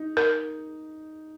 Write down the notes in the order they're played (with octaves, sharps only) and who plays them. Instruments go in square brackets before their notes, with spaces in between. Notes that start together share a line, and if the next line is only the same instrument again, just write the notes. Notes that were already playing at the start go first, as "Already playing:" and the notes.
Already playing: [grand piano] D#4
[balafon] A#4